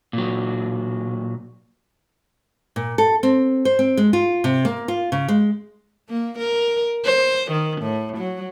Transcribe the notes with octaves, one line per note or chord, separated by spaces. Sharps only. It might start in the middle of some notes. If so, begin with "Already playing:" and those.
A#2 F#3
A#2
A4
C4
C5
C4
G#3
F4
C3
A#3
F4
C#3
G#3
A#3
A#4
C5
D#3
A2
F#3